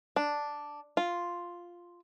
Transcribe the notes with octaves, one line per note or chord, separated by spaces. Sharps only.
D4
F4